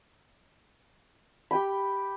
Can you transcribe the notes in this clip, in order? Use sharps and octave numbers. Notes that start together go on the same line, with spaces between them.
G4 G5 B5